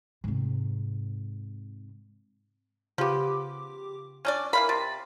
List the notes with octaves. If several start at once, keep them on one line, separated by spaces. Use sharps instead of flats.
G#2 C3
C#3 F3 B3 G4 D6
C#4 D4 D5
E3 A#4 F5 B5
C3 A6